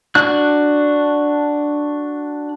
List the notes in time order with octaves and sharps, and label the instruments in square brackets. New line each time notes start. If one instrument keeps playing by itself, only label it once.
[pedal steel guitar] D4 F#4 F#6